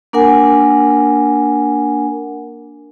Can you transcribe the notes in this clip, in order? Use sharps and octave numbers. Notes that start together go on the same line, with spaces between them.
A#3 D4 A#4 F#5 G#5